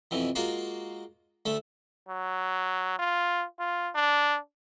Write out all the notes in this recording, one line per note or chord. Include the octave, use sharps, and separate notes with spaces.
F2 B2 E3
G#3 A#3 F4 F#4 F5
D2 A3 E5
F#3
F4
F4
D4